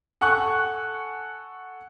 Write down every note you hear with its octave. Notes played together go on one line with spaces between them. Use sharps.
A4 F#5 G#5 C#6 F#6